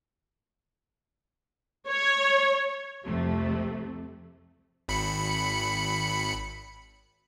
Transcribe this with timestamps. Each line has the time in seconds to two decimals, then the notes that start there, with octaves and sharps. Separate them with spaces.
1.88 C#5
3.04 C2 F2 C3 F3 A3
4.88 G#1 B5 C#7